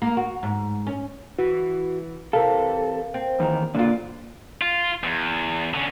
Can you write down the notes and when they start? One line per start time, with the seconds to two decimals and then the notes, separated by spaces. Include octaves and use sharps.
0.02 A#3
0.17 F#4
0.43 G#2
0.87 C#4
1.39 E3 F#4
2.33 C3 E3 A4 A#4 F5
3.14 C4
3.40 E2 D#3
3.74 A#2 D3 D4 F4
4.62 F4
5.04 E2
5.74 D3 C#4